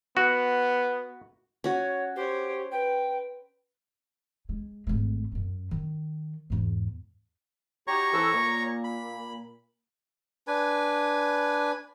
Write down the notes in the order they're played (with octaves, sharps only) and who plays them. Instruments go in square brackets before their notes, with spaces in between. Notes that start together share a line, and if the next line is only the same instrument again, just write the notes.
[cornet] B3 [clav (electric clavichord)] F#4
[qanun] C#4 F#4 [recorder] C#5
[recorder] G4 [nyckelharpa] C5 C#5
[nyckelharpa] B4 [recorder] G5
[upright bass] G#3
G#1 A3
F#2 C#4
D#3
E2 G#2
[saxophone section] D#4 F#4 G4 [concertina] C#5 A#5 C#6
[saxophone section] E3 C4 A4
A#2 A#3
[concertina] B5
[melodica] D4 B4 G#5